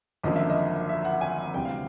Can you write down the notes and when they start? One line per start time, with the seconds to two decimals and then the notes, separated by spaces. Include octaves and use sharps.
0.23 G#1 F#2 D3 F3 A#3 D#5
0.36 E5
0.49 D#5
0.89 E5
1.05 F#5
1.21 G#5
1.54 D2 C3 E3 G3 G5
1.65 F5